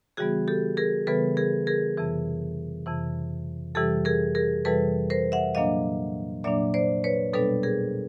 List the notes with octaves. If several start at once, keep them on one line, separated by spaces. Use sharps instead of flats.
C#3 E3 G3 B3 F#4 G#4
G4 A4
G#4 A#4
C#3 E3 G3 B3 A4 B4
G#4 A#4
G#4 A#4
F2 C3 E3
F2 C3 E3
F2 C3 E3 G3 G4 A4
G#4 A#4
G#4 A#4
F2 C3 E3 G3 A4 B4
A#4 C5
E5 F#5
A#2 F#3 A#3 D4 D#5 F5
A#2 F#3 A#3 D4 D5 E5
C5 D5
B4 C#5
B2 G3 B3 D4 A4 B4
G#4 A#4